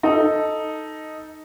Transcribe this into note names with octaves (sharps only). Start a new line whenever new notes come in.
D#4 A4